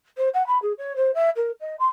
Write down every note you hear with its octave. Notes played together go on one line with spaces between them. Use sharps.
C5
F#5
B5
G#4
C#5
C5
E5
A#4
D#5
C6